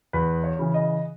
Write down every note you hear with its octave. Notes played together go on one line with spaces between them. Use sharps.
E2 B4
C#5
C#3 E3
D#5